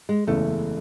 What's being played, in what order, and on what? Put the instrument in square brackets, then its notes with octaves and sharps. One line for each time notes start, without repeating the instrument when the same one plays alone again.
[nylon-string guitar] G#3
[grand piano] F#1 E2 C#3 E3 G#3 [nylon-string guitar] A3